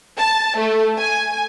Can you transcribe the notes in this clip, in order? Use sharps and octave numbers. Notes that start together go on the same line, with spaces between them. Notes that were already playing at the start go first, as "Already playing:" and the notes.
A5
A3
G#5